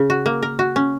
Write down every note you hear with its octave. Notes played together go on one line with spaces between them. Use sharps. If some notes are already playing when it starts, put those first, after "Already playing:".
Already playing: C#3
F#4
A#3
A#4
F#4
C#4